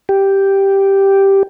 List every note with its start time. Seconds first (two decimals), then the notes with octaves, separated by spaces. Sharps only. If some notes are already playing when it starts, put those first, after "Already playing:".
0.09 G4